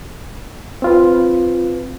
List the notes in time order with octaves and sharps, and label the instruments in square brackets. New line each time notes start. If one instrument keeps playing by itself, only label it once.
[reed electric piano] C4 F4 B4